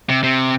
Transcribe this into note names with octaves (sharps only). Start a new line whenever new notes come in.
C3
C3